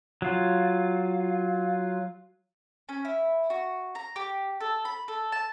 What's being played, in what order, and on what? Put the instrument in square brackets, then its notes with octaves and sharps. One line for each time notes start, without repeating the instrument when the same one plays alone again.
[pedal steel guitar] F#3 F4
[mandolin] C#4
E4
F#4
A#5
G4
A4
B5
A4
A5